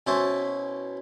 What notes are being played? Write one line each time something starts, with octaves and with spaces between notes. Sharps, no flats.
B2 C#4 E4 C5 A5